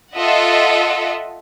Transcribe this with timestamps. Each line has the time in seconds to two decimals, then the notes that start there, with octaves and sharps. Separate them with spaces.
0.16 F4 A4 D#5 E5 F#5